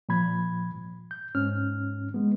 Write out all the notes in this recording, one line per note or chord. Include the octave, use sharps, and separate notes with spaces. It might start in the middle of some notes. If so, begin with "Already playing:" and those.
A#2 F3 B5 G#6
G6
G#2 C#4 F6
G#3 B3